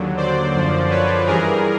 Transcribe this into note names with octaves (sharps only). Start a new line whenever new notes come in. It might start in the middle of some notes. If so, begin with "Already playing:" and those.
Already playing: D#2 D3 F#3
C5 D5
F#2 D3 F3
B4 C#5
G2 E3 G3 G#4 A#4